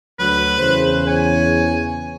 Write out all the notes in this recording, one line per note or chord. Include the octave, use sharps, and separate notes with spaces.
D2 F#3 B4
E2 C#3 C5
C#5 G#5